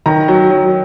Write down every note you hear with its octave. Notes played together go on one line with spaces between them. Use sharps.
D#3 A#5
F#3
F#3